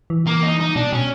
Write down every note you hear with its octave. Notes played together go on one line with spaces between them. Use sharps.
E3
A#3
D#4
D#4
B2 D4
B2 C#4